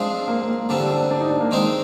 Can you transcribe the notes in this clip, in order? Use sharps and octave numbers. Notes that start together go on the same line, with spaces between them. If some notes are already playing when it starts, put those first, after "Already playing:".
Already playing: F3 G#3 C4 D4 F4 G#4
A#3
A#3
D3 G3 C4 D4
D4
D4
D4
D#4
D4
A#3
D#3 G#3 C4 D#4